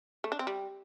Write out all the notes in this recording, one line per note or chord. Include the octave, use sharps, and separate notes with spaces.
A3
D4
C4
G3